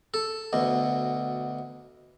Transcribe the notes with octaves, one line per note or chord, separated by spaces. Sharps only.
A4
D2 B2